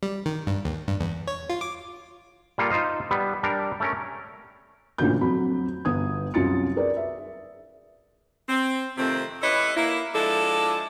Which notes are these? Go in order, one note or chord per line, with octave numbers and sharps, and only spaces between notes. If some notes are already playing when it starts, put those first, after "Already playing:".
G3
D#3
G2
D#2
G2
E2
C#5
F4
D6
G3 A#3 F4 A4
D#4 F4 C5 D#5 F5
G3 B3
G3 D4 A#4
A3 C#4 A#4
A1 A#2 D3 F#4 G6
F2 F#3 B5
G1 B3 D#6 G#6
C2 F#2 F4 A6 C#7
G#4 A#4 B4 D5
E5
C4
F2 C3 D#3 A3 C4
E4 G4 A4 B4 C#5 D#5
A#3 E4
F3 G#3 D4 E4 A4